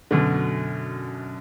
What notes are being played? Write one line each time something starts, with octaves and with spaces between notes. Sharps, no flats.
F#2 B2 D3